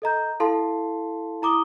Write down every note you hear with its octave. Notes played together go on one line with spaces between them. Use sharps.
A4 D#5 A#5 G6
E4 A4 F5 A5 C6
E4 A#5 D6 D#6 G7